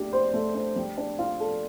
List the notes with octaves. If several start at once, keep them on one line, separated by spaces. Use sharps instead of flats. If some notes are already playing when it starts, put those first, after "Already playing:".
Already playing: A3 D4 G4
C5
A3
D4
G3
D4
F4
A4